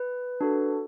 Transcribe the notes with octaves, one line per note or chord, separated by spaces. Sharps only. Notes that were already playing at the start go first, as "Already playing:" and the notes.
Already playing: B4
D4 F#4 A4